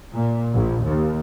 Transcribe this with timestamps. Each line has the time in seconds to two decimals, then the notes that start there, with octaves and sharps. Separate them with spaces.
0.13 A#2
0.54 A#1
0.85 D#2